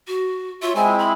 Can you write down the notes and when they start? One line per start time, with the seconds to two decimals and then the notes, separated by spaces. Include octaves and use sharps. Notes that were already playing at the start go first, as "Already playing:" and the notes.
0.07 F#4
0.62 F4 C#5 E5
0.75 G#3 C4 E4 G#5
0.99 B5